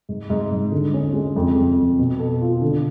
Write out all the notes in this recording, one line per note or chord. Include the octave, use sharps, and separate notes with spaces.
G#2
G#2
G#2
D3
C#4
G#3
F2
F2
F2
B2
A4
F4
D3